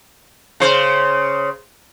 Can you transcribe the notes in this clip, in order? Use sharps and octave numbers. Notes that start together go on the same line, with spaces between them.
C#3 C5